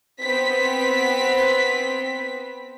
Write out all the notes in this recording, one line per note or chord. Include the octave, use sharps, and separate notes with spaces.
B3 C4 B6